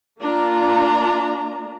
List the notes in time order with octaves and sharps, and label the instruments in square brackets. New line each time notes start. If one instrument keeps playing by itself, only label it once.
[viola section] A#3 D4 F4 A#5